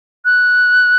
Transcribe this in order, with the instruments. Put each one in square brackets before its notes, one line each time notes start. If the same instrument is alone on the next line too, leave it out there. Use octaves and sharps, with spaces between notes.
[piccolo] F#6